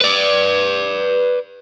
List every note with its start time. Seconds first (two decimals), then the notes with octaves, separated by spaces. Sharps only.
0.02 B4 D5